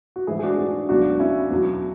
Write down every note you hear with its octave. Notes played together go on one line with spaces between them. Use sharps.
F#4
G#2 E3 E4 G#4
G#4
D4 F#4
D4 F#4
C#2 B2 F#3 D4 F#4
C#4 E4
E2 B2 F#3